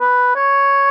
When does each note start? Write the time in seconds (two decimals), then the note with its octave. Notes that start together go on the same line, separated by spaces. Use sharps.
0.01 B4
0.36 C#5